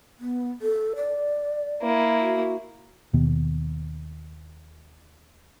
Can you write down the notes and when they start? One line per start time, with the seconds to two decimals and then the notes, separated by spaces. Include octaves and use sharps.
0.20 B3
0.62 A4
0.96 D5
1.82 A#3 E4
2.20 F#4
3.13 D#2 B2 D#3 B3